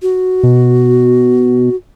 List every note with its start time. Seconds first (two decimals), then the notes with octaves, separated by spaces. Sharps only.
0.02 F#4
0.44 B2